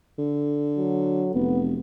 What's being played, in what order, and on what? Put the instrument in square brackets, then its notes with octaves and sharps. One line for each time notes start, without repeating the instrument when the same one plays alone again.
[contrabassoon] D3
[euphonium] F#3
[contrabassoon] F1 [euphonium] B3